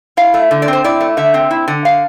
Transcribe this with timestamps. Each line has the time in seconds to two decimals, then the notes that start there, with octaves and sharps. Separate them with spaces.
0.17 E4 F5
0.34 A3
0.51 D3
0.62 D5
0.68 C4 C5
0.84 E4 D5
1.00 A3
1.17 D3 E5
1.34 C4
1.51 E4
1.68 D3
1.85 F5